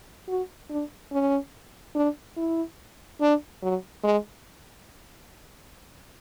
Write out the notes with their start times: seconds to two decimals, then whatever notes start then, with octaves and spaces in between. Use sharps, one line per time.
0.28 F#4
0.70 D4
1.12 C#4
1.95 D4
2.37 E4
3.21 D4
3.62 F#3
4.04 G#3